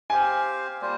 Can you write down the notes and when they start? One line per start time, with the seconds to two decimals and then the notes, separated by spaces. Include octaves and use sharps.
0.10 C4 G4 C5 F5 G#5
0.81 G3 A#3 F4 C5